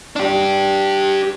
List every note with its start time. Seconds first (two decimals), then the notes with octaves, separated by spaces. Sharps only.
0.16 D4 G4